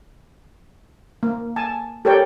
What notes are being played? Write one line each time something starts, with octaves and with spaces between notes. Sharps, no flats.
A#3
G#5 A5
G4 A4 A#4 C#5 D5 G5